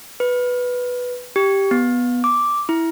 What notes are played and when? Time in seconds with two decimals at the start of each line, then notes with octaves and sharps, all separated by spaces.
0.20 B4
1.36 G4
1.71 B3
2.24 D6
2.69 E4